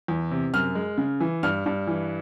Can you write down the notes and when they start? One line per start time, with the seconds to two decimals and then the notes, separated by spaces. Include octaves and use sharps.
0.08 E2
0.31 C3
0.54 F#2 F6
0.75 G#3
0.98 C#3
1.20 E3
1.43 G2 F6
1.66 G2
1.87 E3